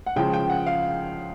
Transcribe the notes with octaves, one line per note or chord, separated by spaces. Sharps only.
F#5
C#3 F3 G#3 G5
G5
F#5
F5